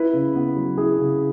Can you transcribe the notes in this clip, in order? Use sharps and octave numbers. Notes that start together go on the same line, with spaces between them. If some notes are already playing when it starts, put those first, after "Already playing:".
Already playing: E4 B4
C#3
B3
F#3
E4 G#4
C#3